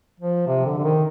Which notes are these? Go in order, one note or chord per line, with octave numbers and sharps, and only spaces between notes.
F3
C3
D3
D3
D#3